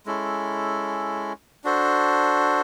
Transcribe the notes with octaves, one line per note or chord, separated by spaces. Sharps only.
G#3 C#4 E4 A4
D4 F#4 A4 C5